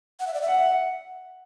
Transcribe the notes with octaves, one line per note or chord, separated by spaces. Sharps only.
F#5
E5
D5
E5
F#5